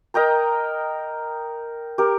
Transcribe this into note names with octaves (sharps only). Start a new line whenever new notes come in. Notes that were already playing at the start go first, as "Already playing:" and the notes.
A#4 D#5 G5 A#5
G4 A#4